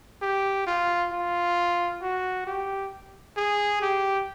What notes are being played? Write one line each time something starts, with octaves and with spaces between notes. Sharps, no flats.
G4
F4
F4
F#4
G4
G#4
G4